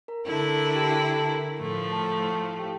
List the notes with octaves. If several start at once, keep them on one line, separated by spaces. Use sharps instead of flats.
A#4 A#5
D3 A3 E4 A#5
A5
A#4 A#5
A#4 A#5
A4 A5
G4 G5
A4 A5
A#4 A#5
A2 F3 A3
A4 A5
A4 A5
A5
G4 G5